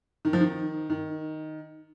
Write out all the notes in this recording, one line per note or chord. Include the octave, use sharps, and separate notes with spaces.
D#3
F3
D#3
D#3